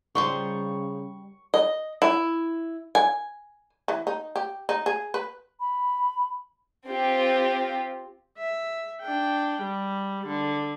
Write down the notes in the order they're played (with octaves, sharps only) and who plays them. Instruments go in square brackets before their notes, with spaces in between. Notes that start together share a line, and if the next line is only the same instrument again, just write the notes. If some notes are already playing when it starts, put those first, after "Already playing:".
[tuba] C#3 [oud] G3 D5 [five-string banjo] D#4 F4 C5 [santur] C#6
[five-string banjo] D#5
E4
G#5
[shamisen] E3
D#4
G4
D#4
G#4
B4
[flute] B5
[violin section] C4 F4 G4
[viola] E5
D4 G5
G3
D3